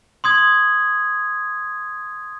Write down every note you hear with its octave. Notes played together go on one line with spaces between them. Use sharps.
C6 D#6 G#6